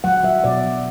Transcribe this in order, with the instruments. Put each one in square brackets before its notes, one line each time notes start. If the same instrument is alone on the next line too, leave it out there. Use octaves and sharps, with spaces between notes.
[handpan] F#3 F#5
F#3 E5
B2 D5
F#3